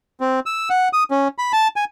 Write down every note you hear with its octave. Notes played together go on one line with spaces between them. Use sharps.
C4
E6
F#5
D#6
C#4
B5
A5
G#5